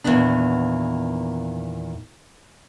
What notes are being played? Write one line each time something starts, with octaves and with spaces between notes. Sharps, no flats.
E2 A#2 D#3 B3 D4